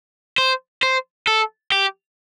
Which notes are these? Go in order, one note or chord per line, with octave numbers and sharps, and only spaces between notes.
C5
C5
A4
G4